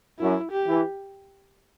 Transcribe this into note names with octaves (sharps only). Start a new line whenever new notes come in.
F#2 E4
G4
E3